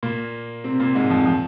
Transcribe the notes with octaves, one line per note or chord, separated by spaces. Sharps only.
A#2 A#3
C3 C4
A#2 A#3
G#2 G#3
F2 F3
F3